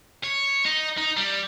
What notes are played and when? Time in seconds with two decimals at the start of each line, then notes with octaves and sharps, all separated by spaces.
0.24 C#5
0.65 D#4
0.98 D#4
1.17 G3